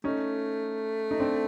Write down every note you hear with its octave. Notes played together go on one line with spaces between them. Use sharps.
A3 C#4 D#4
D#4
C4 D4